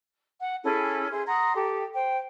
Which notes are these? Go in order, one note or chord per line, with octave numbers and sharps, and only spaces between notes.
F#5
C#4 E4 G#4 A4
G#4 C5 E5
F#5 A#5 C6 D#6
G4 A4
C5 G5